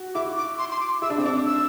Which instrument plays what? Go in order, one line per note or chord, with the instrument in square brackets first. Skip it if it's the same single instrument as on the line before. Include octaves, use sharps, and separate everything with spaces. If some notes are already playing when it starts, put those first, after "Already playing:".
Already playing: [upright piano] F#4
[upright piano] E4 [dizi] D6
[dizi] D6
C6
C6
D6
[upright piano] E4 [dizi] E6
[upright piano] D4
[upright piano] C4 [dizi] E6
[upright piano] D4 [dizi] D6
[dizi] E6